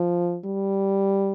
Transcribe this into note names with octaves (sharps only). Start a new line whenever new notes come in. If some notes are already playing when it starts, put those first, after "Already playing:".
Already playing: F3
G3